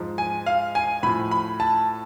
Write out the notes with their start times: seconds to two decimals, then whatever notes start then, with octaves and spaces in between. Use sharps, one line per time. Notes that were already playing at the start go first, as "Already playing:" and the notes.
Already playing: G#2 F3
0.18 G#5
0.46 F5
0.75 G#5
1.03 A2 F3 B5
1.31 B5
1.60 A5